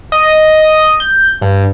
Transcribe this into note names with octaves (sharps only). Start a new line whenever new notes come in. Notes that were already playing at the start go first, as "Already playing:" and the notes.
D#5
G6
G2